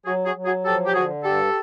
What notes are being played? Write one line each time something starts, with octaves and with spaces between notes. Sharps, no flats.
F#3 F#4 G#4
F#4 G#4
F#3
F#4 G#4
F3 G4 A4
G4
D3 F#4 G#4
G2 G4 A4